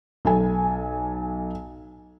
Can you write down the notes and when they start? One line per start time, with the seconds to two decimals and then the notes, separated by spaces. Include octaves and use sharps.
0.25 B1 A4 G#5